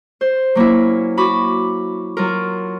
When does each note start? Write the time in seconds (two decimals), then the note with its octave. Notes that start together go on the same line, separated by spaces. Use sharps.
0.21 C5
0.55 F#3 A#3 C#4 E4
1.17 F#4 B5 D6
2.17 F#3 F4 A#4